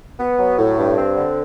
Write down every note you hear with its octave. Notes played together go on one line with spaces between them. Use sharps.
B3
F#3
A2
G2
C4
D3